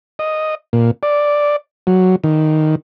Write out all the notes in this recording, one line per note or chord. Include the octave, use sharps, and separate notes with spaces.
D#5
A#2
D5
F#3
D#3